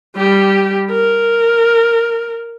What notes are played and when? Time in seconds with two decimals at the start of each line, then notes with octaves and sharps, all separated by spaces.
0.16 G3 G4
0.91 A#4